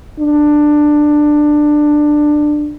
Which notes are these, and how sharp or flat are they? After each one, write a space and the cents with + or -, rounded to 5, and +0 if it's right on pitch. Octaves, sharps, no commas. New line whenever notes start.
D4 +15